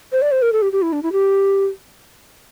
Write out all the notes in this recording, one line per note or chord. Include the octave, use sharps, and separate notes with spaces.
C5
D5
C5
A#4
A4
G4
G4
E4
D4
E4
G4